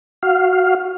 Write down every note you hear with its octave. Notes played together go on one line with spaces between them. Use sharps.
F#4 F5